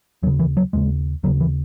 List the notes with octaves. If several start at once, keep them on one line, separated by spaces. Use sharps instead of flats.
D#2 C#3 F#3
E3
F#3
D#2 C#3 G#3
D#2 C#3 F#3
E3